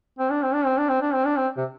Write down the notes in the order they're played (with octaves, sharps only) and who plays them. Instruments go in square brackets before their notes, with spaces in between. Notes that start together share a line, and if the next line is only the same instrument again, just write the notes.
[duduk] C4
D4
C4
D4
C4
D4
C4
D4
C4
D4
C4
C3